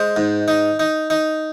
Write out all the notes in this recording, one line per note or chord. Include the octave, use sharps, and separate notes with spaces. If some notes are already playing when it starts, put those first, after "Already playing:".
Already playing: G#3 C5
G#2
D#4
D#4
D#4